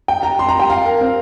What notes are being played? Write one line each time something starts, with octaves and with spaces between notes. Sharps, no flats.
G5
A#5
C6
A#5
G5
F5
A#4
C4